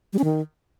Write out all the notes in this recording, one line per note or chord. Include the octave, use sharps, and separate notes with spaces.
G3
C#4
D#3